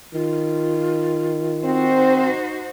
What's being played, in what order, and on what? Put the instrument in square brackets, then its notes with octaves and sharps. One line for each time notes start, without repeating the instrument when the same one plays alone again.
[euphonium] D#3 [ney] F4
[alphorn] C4 [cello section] D#4 F#4 C5